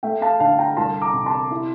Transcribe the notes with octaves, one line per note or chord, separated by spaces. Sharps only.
A3 E5 G5
F5 A5
D3 F5 A5
G5 A#5
C2 A5 C6
A#5 D6
C3
A5 C6
E4